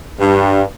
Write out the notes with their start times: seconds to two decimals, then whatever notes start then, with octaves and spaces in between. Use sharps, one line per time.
0.20 G2